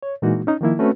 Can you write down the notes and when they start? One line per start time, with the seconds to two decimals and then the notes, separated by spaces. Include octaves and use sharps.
0.03 C#5
0.22 A#2 E3 G#3 A#3 D#4 F#4
0.47 C#4 D#4
0.61 D#3 F3 A#3 E4
0.79 A3 C4 C#4 F#4 B4